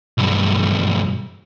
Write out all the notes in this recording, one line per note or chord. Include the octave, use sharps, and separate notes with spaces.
B1 G2